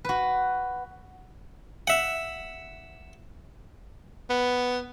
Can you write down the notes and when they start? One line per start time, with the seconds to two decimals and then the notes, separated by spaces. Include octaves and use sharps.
0.05 F#4 B4
1.87 E5 F#5
4.30 B3